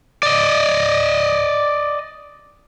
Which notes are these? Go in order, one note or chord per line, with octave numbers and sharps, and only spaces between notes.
D5 D#5